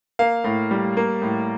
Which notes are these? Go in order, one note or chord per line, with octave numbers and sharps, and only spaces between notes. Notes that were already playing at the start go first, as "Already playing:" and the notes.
A#3 F5
A2
G3
A#3
A2